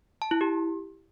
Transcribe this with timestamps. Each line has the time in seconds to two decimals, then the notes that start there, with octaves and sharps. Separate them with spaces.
0.22 A5
0.31 E4
0.41 G4